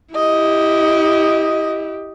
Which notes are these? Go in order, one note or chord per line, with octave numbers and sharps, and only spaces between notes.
E4 G4 D#5